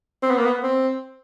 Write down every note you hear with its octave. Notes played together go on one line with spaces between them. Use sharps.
C4
B3
A#3
B3
C4